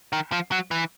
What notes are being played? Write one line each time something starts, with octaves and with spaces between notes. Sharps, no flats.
D#3
F3
F#3
E3